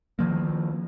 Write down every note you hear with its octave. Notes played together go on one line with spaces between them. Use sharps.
D#3 F3 A#3